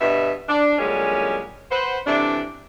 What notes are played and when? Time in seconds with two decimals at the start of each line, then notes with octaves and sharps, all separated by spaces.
0.01 G2 B2 E5
0.49 D4
0.79 F#2 A#2 D3 G3 G#3 C#4
1.71 B4 C5 F#5
2.07 C3 E3 A3 D4